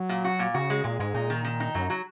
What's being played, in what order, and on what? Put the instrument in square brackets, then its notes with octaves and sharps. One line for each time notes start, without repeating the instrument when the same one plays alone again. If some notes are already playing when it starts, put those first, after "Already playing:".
Already playing: [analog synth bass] F#3
[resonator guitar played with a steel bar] A#2
F#4
A#2
[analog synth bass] C#3 [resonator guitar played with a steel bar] F#4
[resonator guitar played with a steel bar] G#3
[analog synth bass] A#2 [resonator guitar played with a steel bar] G#3
[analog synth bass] G#2 [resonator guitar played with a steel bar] G#3
[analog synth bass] A#2 [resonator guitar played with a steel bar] D#4
[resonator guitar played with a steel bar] D#3
D#3
D#4
[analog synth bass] F#2 [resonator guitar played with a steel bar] F#3
[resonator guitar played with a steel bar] F#3